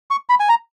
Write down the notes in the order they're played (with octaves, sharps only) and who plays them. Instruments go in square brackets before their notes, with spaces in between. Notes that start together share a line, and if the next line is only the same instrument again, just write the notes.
[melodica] C#6
B5
G#5
A#5